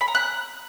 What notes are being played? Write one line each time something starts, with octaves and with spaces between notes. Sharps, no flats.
B5
A#5
F#6